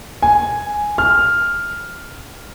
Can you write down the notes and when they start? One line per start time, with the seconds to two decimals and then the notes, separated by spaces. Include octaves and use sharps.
0.22 G#5
0.98 F6